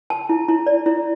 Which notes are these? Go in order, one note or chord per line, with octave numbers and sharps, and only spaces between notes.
A5
E4
E4
D5
E4